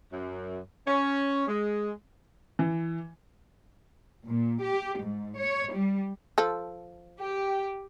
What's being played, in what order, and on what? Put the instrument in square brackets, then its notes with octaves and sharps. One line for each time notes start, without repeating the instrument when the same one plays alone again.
[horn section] F#2
C#4
G#3
[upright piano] E3
[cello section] A#2
G4
G#2
C#5
G3
[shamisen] F3 A4
[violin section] G4